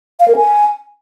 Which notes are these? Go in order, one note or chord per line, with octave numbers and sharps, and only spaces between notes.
F5
A#4
G#5